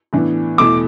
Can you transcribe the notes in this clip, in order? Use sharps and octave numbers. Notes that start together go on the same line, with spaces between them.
A2 E3 B3 D4
E2 B2 A3 E4 D6